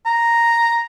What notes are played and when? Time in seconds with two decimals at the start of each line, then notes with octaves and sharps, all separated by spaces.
0.06 A#5